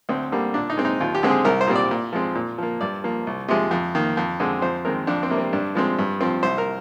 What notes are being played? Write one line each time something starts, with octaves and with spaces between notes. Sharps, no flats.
D2 C4
D3 G3 A#3
A#2 D4
D#4
G#3 C4
D#4
D#2 F4
G4
D3 G#3 C4
G#4
C2 A#4
C5
A#2 G3 C4
D5
A#2
F3 G#3 C4
A#2
F3 A#3
G2 D5
F3 A#3
C2
C3 F3 G#3
F2
D#3 A#3
F2
D3 G#3 C4
F2 C5
D#3 G#3 C4 A#4
F2 D4
C4
C3 G3 A#3
C4
G2 D4
F3 G#3 C4
G2
F3 C4
C2 C5
A#4